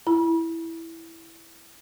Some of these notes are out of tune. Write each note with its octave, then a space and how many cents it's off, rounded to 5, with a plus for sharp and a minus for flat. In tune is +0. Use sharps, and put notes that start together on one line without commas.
E4 +0 B5 -40